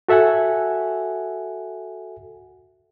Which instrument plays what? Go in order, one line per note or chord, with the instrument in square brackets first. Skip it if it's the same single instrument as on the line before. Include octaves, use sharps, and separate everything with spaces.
[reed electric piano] F#4 A4 E5 F#5 G#5